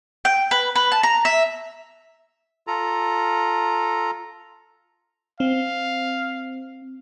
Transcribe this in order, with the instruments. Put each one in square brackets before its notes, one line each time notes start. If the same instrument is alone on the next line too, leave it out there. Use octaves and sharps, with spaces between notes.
[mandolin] G5
B4
B4
A5
A#5
E5
[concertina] F4 A4 A#5
[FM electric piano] C4 [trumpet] F5